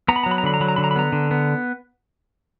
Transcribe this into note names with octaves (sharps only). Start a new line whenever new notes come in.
B3 A#5
B5
A#5
F#3
B5
A#5
D3 B5
A#5
F#3 B5
A#5
D3 B5
A#5
B5
B3 A#5
D3
B3